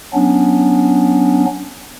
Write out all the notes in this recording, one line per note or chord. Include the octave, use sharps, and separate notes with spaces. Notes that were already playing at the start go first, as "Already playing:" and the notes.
F#3 B3 C#4 D4